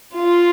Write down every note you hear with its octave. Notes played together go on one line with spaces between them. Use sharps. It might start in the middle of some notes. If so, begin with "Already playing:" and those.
F4